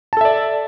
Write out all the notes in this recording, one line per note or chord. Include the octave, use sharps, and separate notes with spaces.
A4 D5 E5 A5